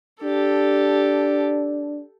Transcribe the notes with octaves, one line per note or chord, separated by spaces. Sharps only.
D4 G4 A4